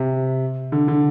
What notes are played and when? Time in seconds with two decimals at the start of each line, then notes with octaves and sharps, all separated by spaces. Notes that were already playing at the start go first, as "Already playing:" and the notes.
Already playing: C3
0.72 D3
0.88 D3